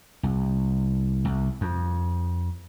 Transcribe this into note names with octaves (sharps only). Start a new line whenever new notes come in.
C2
C2
F2